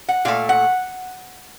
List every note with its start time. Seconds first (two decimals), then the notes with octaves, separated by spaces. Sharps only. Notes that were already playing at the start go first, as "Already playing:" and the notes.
0.09 F#5
0.25 A#2 A3 F5
0.49 F#5